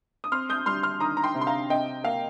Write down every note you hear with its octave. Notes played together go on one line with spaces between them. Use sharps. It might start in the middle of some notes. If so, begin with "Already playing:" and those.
D#6
C4 C6 F6
D#6 G6
G3 C6 F6
C6 F6
D#3 A#5 D#6
A#5
G5 C6
C3
C6
F5 A#5
C3 D#5 G5
A#3 F5